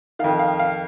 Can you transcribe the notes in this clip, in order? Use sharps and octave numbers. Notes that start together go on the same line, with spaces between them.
F2 D#3 F5
F5
F5